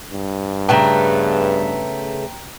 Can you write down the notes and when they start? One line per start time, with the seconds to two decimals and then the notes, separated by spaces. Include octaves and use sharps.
0.12 G2
0.69 C#3 A3 B3 G5 A#5